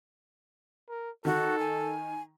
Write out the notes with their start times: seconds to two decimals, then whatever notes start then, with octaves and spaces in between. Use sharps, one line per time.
0.89 A#4
1.25 D#3 F#4 A4
1.59 G#5